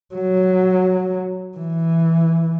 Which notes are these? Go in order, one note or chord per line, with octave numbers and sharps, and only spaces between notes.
F#3
E3